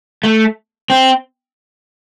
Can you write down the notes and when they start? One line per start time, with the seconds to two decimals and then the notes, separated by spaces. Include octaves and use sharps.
0.23 A3
0.90 C4